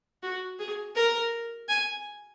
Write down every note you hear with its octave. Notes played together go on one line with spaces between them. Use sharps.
F#4
G#4
A#4
G#5